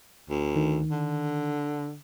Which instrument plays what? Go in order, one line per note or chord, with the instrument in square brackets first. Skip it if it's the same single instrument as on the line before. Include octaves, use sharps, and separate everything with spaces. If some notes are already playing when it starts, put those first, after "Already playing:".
[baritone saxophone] D2
[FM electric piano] D#3
[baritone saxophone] D3